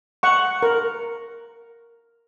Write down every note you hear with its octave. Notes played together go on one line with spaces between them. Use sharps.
F#5 C#6
A#4